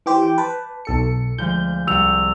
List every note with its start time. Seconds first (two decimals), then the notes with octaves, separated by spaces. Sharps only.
0.06 E3 G4 C5 D6
0.22 D6 G6 D7
0.38 B4 A5 D6
0.85 B1 A4 C#7
1.38 D2 F3 G#3 G6
1.87 C2 E6 C#7 F7